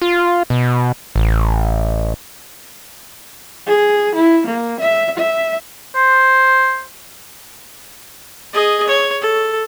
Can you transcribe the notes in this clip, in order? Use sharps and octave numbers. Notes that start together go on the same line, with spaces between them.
F4
B2
A1
G#4
E4
A#3
E5
E5
C5
G#4 D#5
C#5
A4